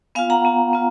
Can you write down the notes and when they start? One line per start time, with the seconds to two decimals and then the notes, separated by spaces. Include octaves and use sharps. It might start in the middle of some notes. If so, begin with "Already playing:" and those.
0.15 B3 F4 F5 G#5
0.30 F#5 A#5
0.45 B3 F4
0.73 B3 F4